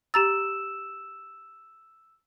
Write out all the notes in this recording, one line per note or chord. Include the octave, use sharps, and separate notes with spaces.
G4 A#5 E6 A6 E7